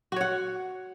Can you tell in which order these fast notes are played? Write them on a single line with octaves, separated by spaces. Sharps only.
F#4 C#5 F#5